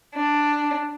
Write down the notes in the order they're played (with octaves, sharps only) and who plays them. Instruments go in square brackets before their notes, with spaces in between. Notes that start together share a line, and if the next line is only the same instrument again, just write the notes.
[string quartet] D4